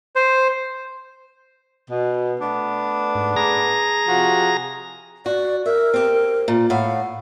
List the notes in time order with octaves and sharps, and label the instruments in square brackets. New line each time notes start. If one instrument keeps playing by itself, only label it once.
[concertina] C5
[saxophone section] B2
A3 B3 D4
[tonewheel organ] G#2
G#4 A#5 A#6
[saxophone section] C3 F3 F#4
[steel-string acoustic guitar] F#4 [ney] D5
[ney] A#4 [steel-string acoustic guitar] E5
[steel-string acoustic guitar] C4 G4
A#2
[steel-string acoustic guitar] A2 F5 [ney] F#5